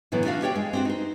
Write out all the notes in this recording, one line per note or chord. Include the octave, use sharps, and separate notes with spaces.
A2 D3 E3 F#3 B3
A3 D4 F4 F#4 F5
G4 C#5 D5 F#5 G5
G#3
C4 D4 F#4
D#4 C5